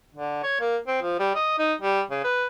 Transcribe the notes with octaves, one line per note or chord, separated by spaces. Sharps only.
D3
C#5
A#3
C4
F3
G3
D#5
D#4
G3
C#3
B4